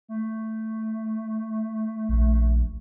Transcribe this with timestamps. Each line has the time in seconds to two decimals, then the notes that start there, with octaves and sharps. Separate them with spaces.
0.09 A3
2.09 A#1